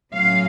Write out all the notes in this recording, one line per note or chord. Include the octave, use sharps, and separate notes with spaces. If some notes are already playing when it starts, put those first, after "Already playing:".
A2 F#3 C#4 F5